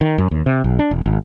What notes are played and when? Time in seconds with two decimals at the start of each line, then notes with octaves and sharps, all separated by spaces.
0.01 D#3
0.18 F#2
0.31 D#2
0.46 C3
0.64 B1
0.79 D4
0.91 E1
1.06 G#1